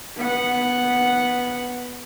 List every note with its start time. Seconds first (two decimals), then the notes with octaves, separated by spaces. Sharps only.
0.17 B3 F#5